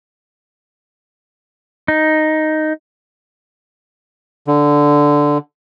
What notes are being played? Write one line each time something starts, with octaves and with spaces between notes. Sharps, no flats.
D#4
D3